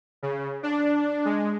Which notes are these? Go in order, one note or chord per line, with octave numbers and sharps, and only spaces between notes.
C#3
D4
G#3